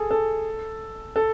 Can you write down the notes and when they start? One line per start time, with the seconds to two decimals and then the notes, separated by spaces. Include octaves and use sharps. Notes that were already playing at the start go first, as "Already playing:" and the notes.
Already playing: G#4 A4
0.11 A4
1.16 A4